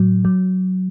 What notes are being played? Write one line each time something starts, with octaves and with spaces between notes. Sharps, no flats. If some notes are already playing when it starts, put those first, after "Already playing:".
Already playing: A2 F#3
F#3